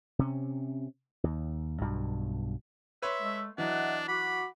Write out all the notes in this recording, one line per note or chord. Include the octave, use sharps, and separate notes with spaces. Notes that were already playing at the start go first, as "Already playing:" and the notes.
C3 C#4
D#2
B1 G2 B2
B4 C#5 E5 C6
G#3 A3
E3 F#3 D4 D#5 E5 F#5
F#4 F#5 B5 D6